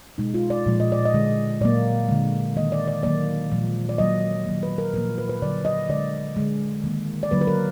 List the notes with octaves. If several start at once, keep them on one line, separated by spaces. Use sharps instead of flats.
B2 G#3 D#4
F4
D5
A#2 F3 G#3
D#5
D5
D#5
D3 G#3
A#2 F#3 A#3 D5
D3 G#3
D#3 A#3 D#5
D5
D5
D#3 F#3 A#3 D5
A#2 F3 G#3
D5
D#3 F#3 A#3 D#5
D#3 F#3 A#3
B4
A#4
A#2 F3 A#3 A#4
B4
B4
D3 F#3 A#3 D5
D#5
D3 G#3 D5
D3 G#3
D#3 A#3
D5
D3 F#3 A#3 B4
B4
A#4